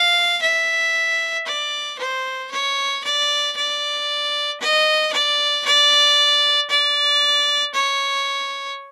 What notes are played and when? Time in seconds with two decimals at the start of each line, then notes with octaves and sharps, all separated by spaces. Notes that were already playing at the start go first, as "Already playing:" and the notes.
Already playing: F5
0.43 E5
1.47 D5
1.99 C5
2.51 C#5
3.05 D5
3.57 D5
4.60 D#5
5.13 D5
5.66 D5
6.70 D5
7.75 C#5